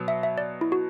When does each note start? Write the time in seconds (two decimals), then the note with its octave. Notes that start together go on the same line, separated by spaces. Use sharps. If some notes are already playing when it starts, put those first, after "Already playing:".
Already playing: B2 F#3 B3
0.08 E5
0.23 E5
0.38 D5
0.61 E4
0.72 F#4